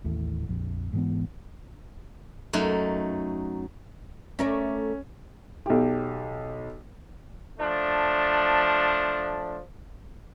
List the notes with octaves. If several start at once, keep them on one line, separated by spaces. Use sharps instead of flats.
A1 D#2 A2 A3
A#1 F2
G#2 E3 B3
F#2 A3 D#4
A3 C#4 A#4 D5
B1 G4
F3 A3 D4